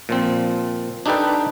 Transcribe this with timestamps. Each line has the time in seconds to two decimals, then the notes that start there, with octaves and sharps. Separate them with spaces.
0.09 A#2 F3 C4
1.06 D4 D#4 G4 A4 B4 G5